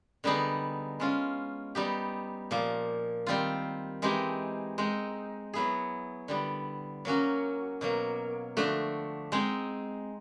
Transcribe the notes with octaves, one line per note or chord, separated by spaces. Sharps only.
D3 G3 B3 D#4 G#4
G#3 C#4 F4
G3 B3 D#4 G4
A#2 F3 A#3
D#3 G3 C4 F4
E3 G#3 C4 D#4 G4
G#3 C4 D#4
F#3 B3 E4 G#4
D3 G3 B3
F#3 A#3 C#4 F#4
B2 F#3 A#3
D3 F3 A3 D4 F#4
G#3 C4 D#4 G#4